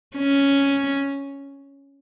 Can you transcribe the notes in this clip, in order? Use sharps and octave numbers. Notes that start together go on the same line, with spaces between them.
C#4